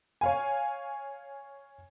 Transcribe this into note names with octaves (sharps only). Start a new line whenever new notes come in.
C#5 F5 G#5